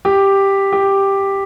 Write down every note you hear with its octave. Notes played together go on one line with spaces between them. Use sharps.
G4
G4